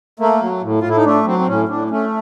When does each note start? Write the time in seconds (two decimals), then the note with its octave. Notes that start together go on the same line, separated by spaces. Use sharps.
0.19 A3 A#3
0.41 F#3
0.62 A2
0.81 A2 F4
0.89 E4
0.96 D#4
1.04 A3 D4
1.26 F#3 C4
1.39 C4
1.47 A2 C#4
1.69 A2 D4
1.90 A3 C#4